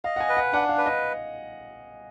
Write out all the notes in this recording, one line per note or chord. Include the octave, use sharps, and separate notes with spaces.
D#5 F5
F#5
G#5
B4
F#5
D4 F#5
F5
B4
D#5